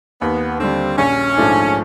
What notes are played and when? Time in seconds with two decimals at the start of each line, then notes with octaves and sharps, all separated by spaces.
0.21 D#2 B3
0.60 D3 G3 C4
0.98 A#1 C#4
1.36 G#2 F3 A3 D4